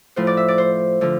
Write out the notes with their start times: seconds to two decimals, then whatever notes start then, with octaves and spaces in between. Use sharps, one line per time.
0.16 A2 F3 C5
0.27 D5
0.37 E5
0.48 D5
0.58 C5
1.01 D3 F3